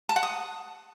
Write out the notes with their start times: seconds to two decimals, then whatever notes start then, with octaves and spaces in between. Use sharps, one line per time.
0.09 A5
0.16 F#5
0.23 D#6